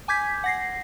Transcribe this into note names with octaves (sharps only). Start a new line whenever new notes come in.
G#5 D6 G6 G#6 B6
F#5 A#6 C7